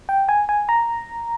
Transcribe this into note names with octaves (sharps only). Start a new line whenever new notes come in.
G5
G#5
G#5
A#5